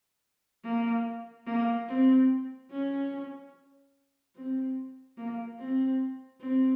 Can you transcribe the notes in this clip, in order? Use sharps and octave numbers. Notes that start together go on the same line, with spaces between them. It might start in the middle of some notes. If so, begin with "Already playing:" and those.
A#3
A#3
C4
C#4
C4
A#3
C4
C4